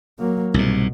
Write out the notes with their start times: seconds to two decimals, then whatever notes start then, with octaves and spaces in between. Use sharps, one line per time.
0.19 F#3 A#3
0.54 C2 G#2 B2